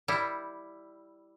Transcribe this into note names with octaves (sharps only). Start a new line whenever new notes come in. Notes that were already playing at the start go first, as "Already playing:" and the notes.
G3 E4